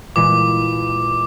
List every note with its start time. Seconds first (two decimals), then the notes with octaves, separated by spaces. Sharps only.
0.16 A#2 E3 G#3 D6